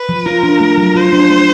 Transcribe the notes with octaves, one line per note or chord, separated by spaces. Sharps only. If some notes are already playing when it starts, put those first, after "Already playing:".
Already playing: B4
F3
F4 A#4
D4
A3
F#3
F4 C5
D4
A3